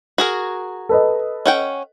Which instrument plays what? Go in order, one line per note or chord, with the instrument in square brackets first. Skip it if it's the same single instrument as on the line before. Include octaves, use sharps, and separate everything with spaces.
[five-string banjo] F#4 G#4 A#4
[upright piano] A4 B4 D#5
[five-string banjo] C#4 F#5 G5